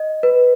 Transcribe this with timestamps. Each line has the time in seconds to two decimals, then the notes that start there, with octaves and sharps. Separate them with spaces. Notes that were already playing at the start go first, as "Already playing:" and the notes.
Already playing: D#5
0.23 B4